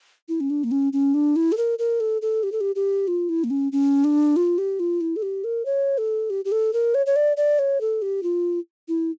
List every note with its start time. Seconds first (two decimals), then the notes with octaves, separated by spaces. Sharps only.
0.29 E4
0.40 C#4
0.50 D4
0.64 A#3
0.71 C#4
0.93 C#4
1.14 D4
1.36 E4
1.52 A4
1.57 A#4
1.79 A#4
2.00 A4
2.22 A4
2.43 G4
2.52 A4
2.61 G4
2.75 G4
3.08 F4
3.29 E4
3.44 A#3
3.50 C#4
3.72 C#4
4.04 D4
4.36 F4
4.58 G4
4.80 F4
5.01 E4
5.16 A4
5.22 G4
5.44 A#4
5.65 C#5
5.98 A4
6.30 G4
6.45 G4
6.52 A4
6.73 A#4
6.94 C#5
7.06 C#5
7.16 D5
7.37 D5
7.59 C#5
7.81 A4
8.02 G4
8.23 F4
8.88 E4